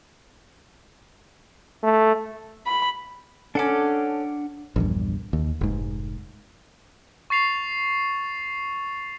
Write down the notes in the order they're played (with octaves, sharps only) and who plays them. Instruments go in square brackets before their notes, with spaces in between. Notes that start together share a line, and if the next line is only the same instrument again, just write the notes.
[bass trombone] A3
[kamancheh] B5
[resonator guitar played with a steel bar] C#4 A4 [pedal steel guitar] D4 F#5 D6
[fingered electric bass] A#1 E2 G2
D#2
F1 G#2
[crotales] C#6 A6 C7 F7